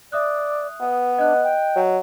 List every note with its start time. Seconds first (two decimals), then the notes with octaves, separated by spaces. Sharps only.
0.12 D5 E5 D#6 F#6
0.81 B3 B4
1.18 D4 D#5 F#6
1.44 G5
1.76 F#3